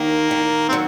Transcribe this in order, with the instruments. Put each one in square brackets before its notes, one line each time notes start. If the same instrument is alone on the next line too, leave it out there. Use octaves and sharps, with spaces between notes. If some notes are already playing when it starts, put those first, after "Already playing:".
Already playing: [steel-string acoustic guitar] D#2 D#3 [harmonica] A#3
[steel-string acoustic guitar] D#3
[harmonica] C4
[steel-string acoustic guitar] F#3